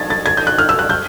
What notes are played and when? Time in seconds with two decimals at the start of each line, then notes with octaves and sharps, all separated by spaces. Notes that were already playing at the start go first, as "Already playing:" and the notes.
Already playing: G#6 A6
0.10 A6
0.26 G#6
0.37 G6
0.47 F#6
0.58 F6
0.69 E6
0.79 F#6
0.89 G6